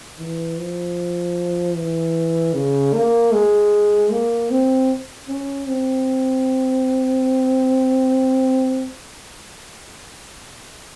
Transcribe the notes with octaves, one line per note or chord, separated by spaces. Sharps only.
E3
F3
E3
C#3
A#3
G#3
A#3
C4
C#4
C4